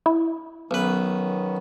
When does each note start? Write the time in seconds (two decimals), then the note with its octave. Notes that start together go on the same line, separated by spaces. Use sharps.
0.06 E4
0.71 B1 D#3 B3 C#4 B4